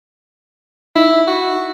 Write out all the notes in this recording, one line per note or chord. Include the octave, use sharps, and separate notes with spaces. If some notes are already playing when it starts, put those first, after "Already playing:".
D#4 E4
F#4